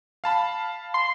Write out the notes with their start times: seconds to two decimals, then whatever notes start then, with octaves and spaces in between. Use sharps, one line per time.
0.24 F5 A5 B5
0.94 C6